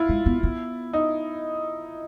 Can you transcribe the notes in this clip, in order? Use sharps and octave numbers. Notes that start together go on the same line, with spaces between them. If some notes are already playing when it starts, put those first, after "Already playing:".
Already playing: E4 F4
G#3
B3
B3
D#4